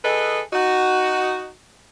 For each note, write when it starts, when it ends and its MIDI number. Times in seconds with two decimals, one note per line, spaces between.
0.04 0.41 52
0.04 0.41 68
0.04 0.41 69
0.04 0.41 71
0.04 0.41 75
0.53 1.49 63
0.53 1.49 66